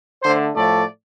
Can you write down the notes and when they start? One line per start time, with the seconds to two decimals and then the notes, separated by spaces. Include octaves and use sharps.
0.22 D3 A3 C5
0.55 A2 F3 A3 D5